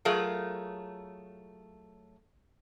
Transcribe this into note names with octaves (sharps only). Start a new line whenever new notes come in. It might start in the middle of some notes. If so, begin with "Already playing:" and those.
F#3 A3 F4 G#4 A#4